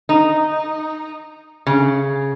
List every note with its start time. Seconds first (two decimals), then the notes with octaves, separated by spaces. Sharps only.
0.09 D#4
1.67 C#3